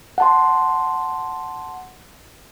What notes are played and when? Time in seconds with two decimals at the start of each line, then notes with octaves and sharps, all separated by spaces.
0.18 F#5 A5 C6